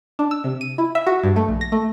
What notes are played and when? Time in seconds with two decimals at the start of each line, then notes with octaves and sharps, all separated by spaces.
0.19 D4
0.31 E6
0.44 C3
0.61 D#7
0.78 E4
0.95 E5
1.07 F#4
1.23 G2
1.36 A3
1.49 A#1
1.61 A#6
1.72 A3